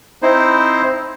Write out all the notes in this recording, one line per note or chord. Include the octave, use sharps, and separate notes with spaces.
C4 D#4 E4 C5